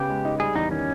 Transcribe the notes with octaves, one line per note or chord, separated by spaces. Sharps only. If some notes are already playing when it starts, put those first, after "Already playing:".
Already playing: C#3 B3 G4
G#3
D#4
G3 G#4
E2 D#4
D#3 C#4